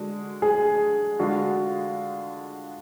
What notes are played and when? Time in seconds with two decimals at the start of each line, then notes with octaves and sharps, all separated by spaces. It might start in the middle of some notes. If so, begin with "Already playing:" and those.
Already playing: D3 G#3 D4 F#4
0.42 G#4
1.19 D3 G#3 D4 F4 F#4